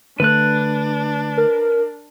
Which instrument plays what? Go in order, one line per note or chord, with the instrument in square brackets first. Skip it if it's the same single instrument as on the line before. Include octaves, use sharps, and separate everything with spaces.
[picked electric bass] D3 A3 [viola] D4 [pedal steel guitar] B4 F#6
[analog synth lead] A#4